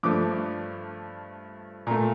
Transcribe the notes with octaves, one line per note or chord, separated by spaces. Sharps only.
G2 F3 A3 D6
A#2 A3 A#5